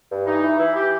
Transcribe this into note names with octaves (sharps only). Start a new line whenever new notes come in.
G2
E3 D#4
E3
E3 E4
G4